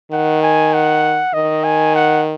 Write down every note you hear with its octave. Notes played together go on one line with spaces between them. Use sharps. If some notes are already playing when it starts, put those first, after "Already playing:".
D#3 F#5
G#5
F#5
D#3 D#5
G#5
F#5